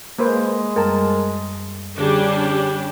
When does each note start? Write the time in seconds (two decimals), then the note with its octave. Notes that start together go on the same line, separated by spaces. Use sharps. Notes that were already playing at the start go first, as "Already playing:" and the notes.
0.19 G#3 A#3 B4 C5
0.76 F#2 G3 A#4 A5 A6
1.98 D3 G3 C#4 D4 G4 G#4